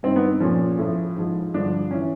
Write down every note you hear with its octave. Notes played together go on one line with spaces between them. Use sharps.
G2 D#3 C4
B3
A#2 F3 C#4
A2 F3
G#2 F3
G2 D3 F3 D4
E3 C#4